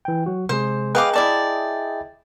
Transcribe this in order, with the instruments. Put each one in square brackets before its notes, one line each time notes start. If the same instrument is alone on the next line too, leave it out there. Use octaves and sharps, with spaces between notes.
[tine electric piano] E3 G5
F#3 F#4
[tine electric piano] C3 G#3 G#4 [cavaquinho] C5
[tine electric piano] G#4 D#5 G5 [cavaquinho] B4 F5 D6
[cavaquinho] E4 D5 A5